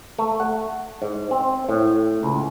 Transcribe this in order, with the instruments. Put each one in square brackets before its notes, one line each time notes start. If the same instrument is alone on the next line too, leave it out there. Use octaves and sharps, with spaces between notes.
[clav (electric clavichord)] A3
F#5
G#2
C4
A2
C#2